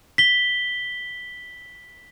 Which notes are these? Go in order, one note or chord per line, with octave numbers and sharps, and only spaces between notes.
B6 G7